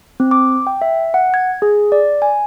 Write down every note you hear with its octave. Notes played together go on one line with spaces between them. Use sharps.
C4
D6
G5
E5
F#5
G#6
G#4
D5
G#5